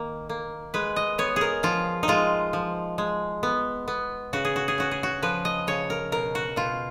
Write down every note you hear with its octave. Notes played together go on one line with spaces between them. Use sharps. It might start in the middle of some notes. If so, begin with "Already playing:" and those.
Already playing: D#3 A#3
A#3
G#3 B4
D#5
B3 C#5
G#4 A#4
F3 F4
D#4
G#3 F4
F3
G#3
B3
B3
C#3 F#4
G#4
F#4
G#4
C#4 F#4
G#4
F#4
F3 B4
D#5
C#3 C#5
A#4
B2 A#4
F#4
B2 F4